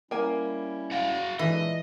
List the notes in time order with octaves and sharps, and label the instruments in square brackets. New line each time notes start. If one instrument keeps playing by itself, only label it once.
[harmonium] G3 C#4 E4 [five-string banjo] A#3 G#5
[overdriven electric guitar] F#4 F5
[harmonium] A#2 G#3 D4 [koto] E3 [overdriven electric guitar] D#5